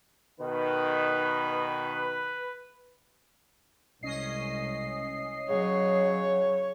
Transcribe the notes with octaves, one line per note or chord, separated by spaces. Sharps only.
B2 D#3 B4
C2 G#3 C#4 D#5 C7
C#3 F#3 C#5